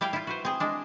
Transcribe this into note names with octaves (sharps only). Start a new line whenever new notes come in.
G3 E4 F5 G5
E4 F4
F#4 B4 C5
C4 G#4
G#3 D4